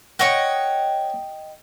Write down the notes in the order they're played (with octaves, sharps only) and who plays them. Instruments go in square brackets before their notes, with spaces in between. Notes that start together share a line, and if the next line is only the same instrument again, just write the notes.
[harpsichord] C#5 F#5 [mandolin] D#5 G5 C#6